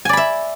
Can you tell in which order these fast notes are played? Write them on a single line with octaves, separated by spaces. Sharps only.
G#5 D5 B5 E5